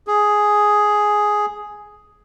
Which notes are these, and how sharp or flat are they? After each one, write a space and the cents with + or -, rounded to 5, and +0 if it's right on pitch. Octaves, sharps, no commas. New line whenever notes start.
G#4 +5